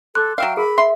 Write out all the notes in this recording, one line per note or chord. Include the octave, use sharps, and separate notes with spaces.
A4 C6 D6 F#6
F#3 E5 F5 G5
G#4 A#4 B5
E5 C6